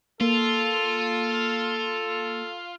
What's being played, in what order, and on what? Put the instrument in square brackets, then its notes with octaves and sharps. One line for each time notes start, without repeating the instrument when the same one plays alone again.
[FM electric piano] A#3 [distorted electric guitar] F4 [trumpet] A4